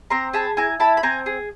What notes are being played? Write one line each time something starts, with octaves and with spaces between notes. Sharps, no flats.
C4 A#5 C6
G#4 A5 B5
E4 G#5 A#5
E4 A5 B5
B5
C4 G#5 A#5
G#4